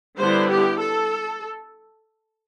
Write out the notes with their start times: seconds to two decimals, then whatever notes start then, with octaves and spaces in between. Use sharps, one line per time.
0.18 D3 G3 B3 E4 C5
0.49 G4
0.79 A4